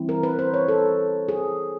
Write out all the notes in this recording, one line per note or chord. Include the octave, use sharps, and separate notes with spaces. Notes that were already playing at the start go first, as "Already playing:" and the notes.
Already playing: E3 G3 C4 E4
A#4
B4
C5
C#5
A4
G#4